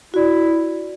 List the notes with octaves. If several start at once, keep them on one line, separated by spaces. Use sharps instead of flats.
E4 F#4 D5